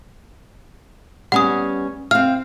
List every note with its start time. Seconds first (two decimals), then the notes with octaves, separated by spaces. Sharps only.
1.32 G3 B3 C#4 F#5 D#6
2.11 C4 F5 F6